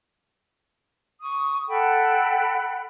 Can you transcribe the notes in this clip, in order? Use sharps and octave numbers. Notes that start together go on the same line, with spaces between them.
C#6 D#6
A4 F#5 G5 B5